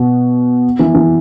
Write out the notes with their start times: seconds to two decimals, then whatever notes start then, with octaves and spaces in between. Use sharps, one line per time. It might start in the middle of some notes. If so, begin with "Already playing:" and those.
Already playing: B2
0.79 E3
0.94 E3